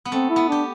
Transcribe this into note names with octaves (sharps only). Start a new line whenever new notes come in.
B3
A3 C4
E4
B3
D4 G4